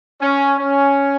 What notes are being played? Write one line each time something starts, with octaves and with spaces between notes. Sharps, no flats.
C#4
C#4